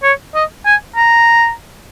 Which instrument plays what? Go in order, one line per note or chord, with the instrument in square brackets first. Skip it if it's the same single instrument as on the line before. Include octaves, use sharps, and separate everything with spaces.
[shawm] C#5
D#5
G#5
A#5